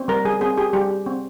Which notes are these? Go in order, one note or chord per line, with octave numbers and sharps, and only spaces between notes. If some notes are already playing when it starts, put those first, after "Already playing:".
Already playing: C4
G3 A#4
G3 G#4
C4 G#4
G4 G#4
G3 G4
G4
C4